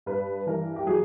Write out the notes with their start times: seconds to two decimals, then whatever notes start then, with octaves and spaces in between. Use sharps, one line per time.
0.06 G2 B4
0.47 E3 A#4
0.76 G4
0.86 F#3 G#4